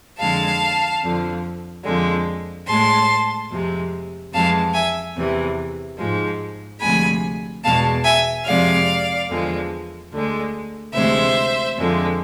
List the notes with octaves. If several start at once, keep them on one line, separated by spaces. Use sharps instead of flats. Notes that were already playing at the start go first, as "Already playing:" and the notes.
F2 D3 G#3 F5 A5
F2 D3 F3
F2 D3 F3 G#3
A2 G#3 A5 C6
F2 C3 G#3
F2 E3 G#3 F5 A5
E5 G#5
E2 C3 E3
G#2 F3 G#3
D2 C3 F3 G#3 G#5 B5
E2 B2 G#3 F5 A5
E5 G#5
F2 C3 F3 G#3 D5 F5
E2 D3 F3 G#3
D2 D3 G#3
D2 C3 E3 G#3 C5 E5
F2 D3 F3 G#3